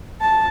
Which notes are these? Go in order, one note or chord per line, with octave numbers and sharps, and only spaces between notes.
A5